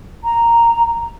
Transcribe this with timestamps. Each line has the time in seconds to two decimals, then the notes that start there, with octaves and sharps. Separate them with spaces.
0.24 A#5